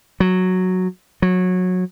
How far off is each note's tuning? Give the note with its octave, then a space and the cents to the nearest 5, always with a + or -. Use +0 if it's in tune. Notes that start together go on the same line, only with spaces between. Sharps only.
F#3 -5
F#3 -20